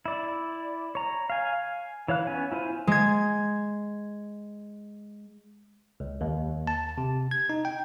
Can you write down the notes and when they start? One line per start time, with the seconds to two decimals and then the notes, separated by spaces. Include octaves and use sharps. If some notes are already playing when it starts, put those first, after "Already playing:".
0.06 E4 D5
0.95 C#5 A#5
1.30 F5 G#5
2.08 E3 C#5 F5 F#6
2.27 B3 C#4 G#5
2.52 E4 F4 C5 G#5
2.87 G#3 G#6
6.00 C#2
6.21 D#2
6.67 A5
6.98 C3
7.31 G#6
7.50 D#4
7.65 G5